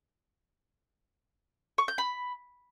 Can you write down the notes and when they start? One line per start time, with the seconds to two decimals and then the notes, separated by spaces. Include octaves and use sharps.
1.78 C#6
1.88 G6
1.98 B5